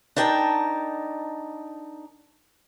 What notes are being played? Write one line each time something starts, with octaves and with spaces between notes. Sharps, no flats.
D4 D#4 A#4 G5 A5